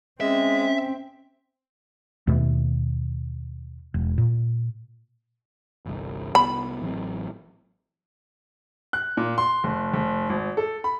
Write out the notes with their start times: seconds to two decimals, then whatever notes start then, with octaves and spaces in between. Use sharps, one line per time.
0.21 G#3 C4 C#4 E5
2.27 D#2 B2 A3
3.94 E1
4.18 A#2
5.86 G1 C2
6.35 C2 B3 B5
6.82 A1 F#3 C4
8.93 F#6
9.17 A#2
9.38 C6
9.64 F1
9.94 F1
10.30 G#1
10.57 A4
10.84 B5